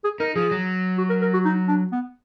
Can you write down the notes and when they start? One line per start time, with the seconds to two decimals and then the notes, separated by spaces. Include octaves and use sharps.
0.04 G#4
0.20 D#4 A#4
0.36 F3 G#4
0.51 F#3
0.98 F#4
1.10 A#4
1.21 A#4
1.34 F#4
1.45 D#4
1.68 D4
1.92 B3